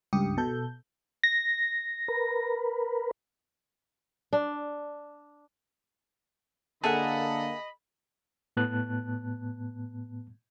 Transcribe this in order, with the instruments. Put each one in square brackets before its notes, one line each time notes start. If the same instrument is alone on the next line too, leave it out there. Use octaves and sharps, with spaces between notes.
[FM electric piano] C#2 G2 G4 D#6 C#7
B2 A4 G6
A#6
[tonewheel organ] A#4 B4
[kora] D4
[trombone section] D3 A#3 [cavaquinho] G#4 E5 F#5 [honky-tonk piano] A4 [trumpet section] D#5 B5
[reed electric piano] A2 B3 A5 F#6